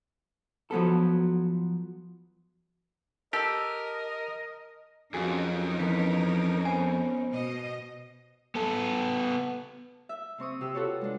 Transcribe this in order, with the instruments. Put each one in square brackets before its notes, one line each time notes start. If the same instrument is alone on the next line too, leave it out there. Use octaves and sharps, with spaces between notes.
[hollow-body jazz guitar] F3 F#3 B3 A4
[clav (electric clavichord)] G4 [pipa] A4 [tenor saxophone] A#4 [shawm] D#5
[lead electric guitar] F2 [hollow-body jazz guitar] F#3 F#4 G#4 [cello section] C#4 D#4 A#4
[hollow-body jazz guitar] E3 F3 B3 [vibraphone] B4
[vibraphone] B3 C5 [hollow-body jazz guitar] G#5
[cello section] B2 D#5
[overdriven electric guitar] B3 A4
[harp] E5
C3 C4 C#6 D#6
C3 G4 E6
F4 F#4 A4 B4 C#5
G#3 D4